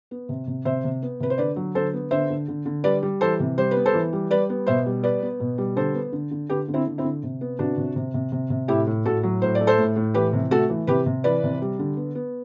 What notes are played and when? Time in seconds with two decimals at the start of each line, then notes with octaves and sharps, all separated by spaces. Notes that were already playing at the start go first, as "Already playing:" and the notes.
0.11 B3
0.29 C3
0.47 C3
0.65 C3 C5 E5
0.84 C3
1.02 B3
1.20 C3 B4
1.30 C5
1.38 D3 B4 D5
1.56 F#3
1.75 D3 A4 C5
1.94 B3
2.11 D3 C5 E5
2.30 D3
2.48 D3
2.66 D3
2.84 G3 B4 D5
3.02 G3
3.21 E3 A4 C5
3.40 C3
3.58 G3 C5
3.71 B4
3.76 B3
3.86 A4 C5
3.94 E3
4.13 G3
4.30 G3 B4 D5
4.49 B3
4.66 B2 C5 E5
4.86 G3
5.03 B3 B4 D5
5.22 B3
5.40 B2
5.58 G3
5.76 D3 A4 C5
5.94 B3
6.13 D3
6.31 D3
6.49 D3 G4 B4
6.68 D3
6.74 C4 E4
6.87 D3
6.98 C4 E4
7.04 D3
7.23 C3
7.41 B3
7.59 C3 D4 F#4
7.78 C3
7.96 C3
8.14 C3
8.32 C3
8.50 C3
8.68 A2 E4 G4
8.87 A2
9.05 A2 F#4 A4
9.23 F#3
9.42 A2 C5
9.55 D5
9.61 A3
9.67 A4 C5
9.79 A2
9.96 A2
10.14 E3 G4 B4
10.33 C3
10.51 A3 F#4 A4
10.69 E3
10.87 C3 G4 B4
11.06 C3
11.24 E3 B4 D5
11.43 C3
11.62 G3
11.79 D3
11.97 B3
12.15 B3